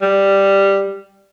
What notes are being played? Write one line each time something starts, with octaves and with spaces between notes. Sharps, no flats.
G3